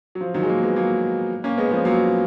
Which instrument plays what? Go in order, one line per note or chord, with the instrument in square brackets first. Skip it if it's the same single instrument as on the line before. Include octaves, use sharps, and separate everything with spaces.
[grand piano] F#3
F3
D#3 F#3
G#3
F#3 A#3
G#3 B3
F#3 A#3
A#3 C#4
G#3 B3
F3 G#3
F#3 A#3